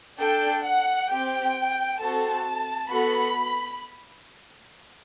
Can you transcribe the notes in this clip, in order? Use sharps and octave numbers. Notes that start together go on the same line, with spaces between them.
D4 A4 G5
F#5
C4 G4 G5
C4 F#4 A4 A5
B3 F#4 A4 B5